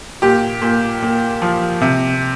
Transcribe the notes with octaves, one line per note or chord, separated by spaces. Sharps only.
A#2 G4
A#2
A#3
F3
C3